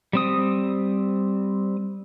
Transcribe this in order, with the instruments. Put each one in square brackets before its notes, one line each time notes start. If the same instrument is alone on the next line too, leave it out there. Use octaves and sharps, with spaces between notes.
[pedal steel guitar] G3 C4 D#6